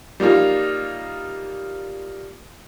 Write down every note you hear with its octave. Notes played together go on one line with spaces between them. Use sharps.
G3 A#3 D#4 F4